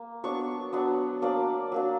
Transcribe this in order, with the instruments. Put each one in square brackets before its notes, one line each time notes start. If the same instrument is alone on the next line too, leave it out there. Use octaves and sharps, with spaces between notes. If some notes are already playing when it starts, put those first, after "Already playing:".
Already playing: [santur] A#3
F#3 B3 D4 C#6
F#3 B3 D4
F#3 A#3 D4 D5
F#3 A#3 D4